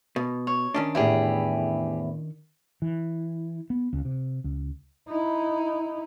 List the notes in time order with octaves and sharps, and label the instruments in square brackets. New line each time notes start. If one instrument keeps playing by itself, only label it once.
[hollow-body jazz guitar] B2
[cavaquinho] C#5
[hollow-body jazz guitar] D#3 C#4 D4
[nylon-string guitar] E2 A2 [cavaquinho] E4 G4 G#4
[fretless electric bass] E3
B3
C#2
C3
C#2
[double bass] D#4 E4